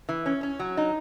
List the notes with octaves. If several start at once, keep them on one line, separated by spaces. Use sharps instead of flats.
E3
C#4
C#4
F#3
D#4